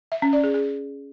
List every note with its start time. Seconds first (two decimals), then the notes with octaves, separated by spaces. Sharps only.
0.12 E5
0.22 C#4
0.33 D5
0.44 G#4
0.54 G#4